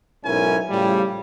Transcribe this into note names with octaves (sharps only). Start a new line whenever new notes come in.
B1 G#2 C#4 E4 A#4 G#5
A2 C#3 F3 G3